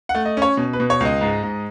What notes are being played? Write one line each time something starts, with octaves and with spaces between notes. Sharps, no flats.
F#5
A3
D#5
C#4 C#5
B2
B4
B2
C#5
C#2 D#5
G#2
G#2